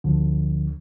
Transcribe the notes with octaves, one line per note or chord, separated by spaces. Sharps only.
D2 D3 F3